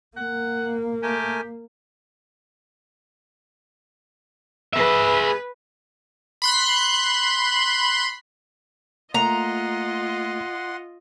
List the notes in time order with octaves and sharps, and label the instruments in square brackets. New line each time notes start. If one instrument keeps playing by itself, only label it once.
[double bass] A#3 [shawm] F#5
[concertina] A3 A#4 G#5 [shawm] G4
[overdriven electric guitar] G#4 E5 [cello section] B4
[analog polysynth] B5 C6 F#6
[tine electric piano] A3 A#3 [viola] F4 D#5 [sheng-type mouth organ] F#5 C6 [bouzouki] A#5